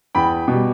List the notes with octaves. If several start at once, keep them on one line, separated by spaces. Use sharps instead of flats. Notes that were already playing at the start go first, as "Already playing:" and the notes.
E2 G5 B5
B2
G3